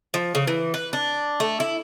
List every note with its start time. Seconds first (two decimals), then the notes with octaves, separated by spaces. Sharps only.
0.14 F3
0.35 C#3
0.47 E3
0.74 B4
0.93 D4
1.40 A3
1.60 E4